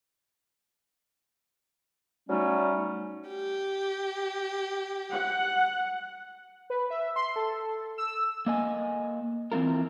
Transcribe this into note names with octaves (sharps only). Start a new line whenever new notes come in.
F#3 G3 A3 C#4 D#4
G4
F#5
B4
E5
C6
A4
E6
A#3 D#5 G#5
E3 C4 E4 F4 A#4